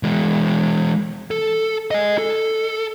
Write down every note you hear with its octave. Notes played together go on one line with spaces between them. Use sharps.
E3 G#3
A4
D#5 G#5
A4